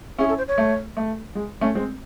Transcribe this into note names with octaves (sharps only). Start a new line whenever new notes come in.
C#4 E4 G#4
A4
C5
C#5
A3
A3
G#3
A3 C#4
G#3 C4